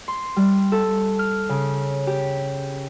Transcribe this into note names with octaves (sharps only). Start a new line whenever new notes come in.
C6
G3
A4
F6
C#3
G4